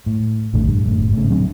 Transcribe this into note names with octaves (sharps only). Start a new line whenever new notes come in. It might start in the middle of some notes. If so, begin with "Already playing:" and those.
A2
A1 F2 A2 D3
G2
F#1 A2
A2 C#3
D1 F#3 C4 D4